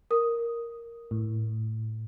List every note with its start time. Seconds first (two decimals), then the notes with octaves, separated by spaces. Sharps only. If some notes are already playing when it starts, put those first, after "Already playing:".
0.11 A#4 D#6
1.11 A2